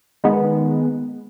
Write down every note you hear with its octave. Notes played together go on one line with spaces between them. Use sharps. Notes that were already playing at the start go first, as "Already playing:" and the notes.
D#3 G#3 B3